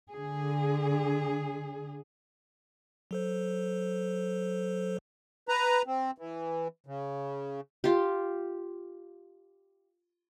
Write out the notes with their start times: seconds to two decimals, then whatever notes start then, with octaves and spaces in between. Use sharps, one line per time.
0.10 D3 G#4
3.11 F#3 A4 C5
5.49 B4 A#5
5.87 C4
6.18 E3
6.87 C#3
7.84 F4 G4